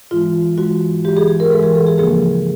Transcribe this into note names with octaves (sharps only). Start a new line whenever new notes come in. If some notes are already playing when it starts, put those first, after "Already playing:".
G#2 E3 G#3 F4
G#2 E3 G#3 F#4
G#2 E3 G#3 G4
G#4
G#4
A#4
G#2 E3 G#3 A4
G#4
A4
G#4
D2 C#3 F3 A#3 G#4